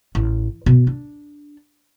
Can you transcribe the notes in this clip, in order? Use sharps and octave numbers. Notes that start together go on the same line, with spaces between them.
A1
B2
D4